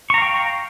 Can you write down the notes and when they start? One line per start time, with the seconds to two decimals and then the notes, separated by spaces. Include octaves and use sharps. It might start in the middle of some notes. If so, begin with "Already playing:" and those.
0.10 C#6
0.14 A#5
0.18 F5
0.22 G5